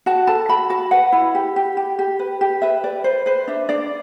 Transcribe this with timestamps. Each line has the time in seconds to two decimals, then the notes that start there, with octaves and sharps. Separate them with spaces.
0.06 F#4 A5
0.27 A4 A5
0.49 F#4 B5
0.70 F#4 A5
0.91 B4 F#5
1.12 E4
1.35 G4
1.56 G4
1.77 G4
1.99 G4
2.19 B4
2.41 G4
2.62 B4 E5
2.84 B4 D5
3.04 B4 C5
3.26 B4 C5
3.48 D4 E5
3.69 D4 D5